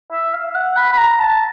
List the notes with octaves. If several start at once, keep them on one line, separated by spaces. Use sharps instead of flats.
E5
F5
F#5
B5
B5
A#5
A5